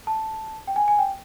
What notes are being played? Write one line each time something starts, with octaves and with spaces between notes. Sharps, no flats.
A5
G5
G#5
G#5
G5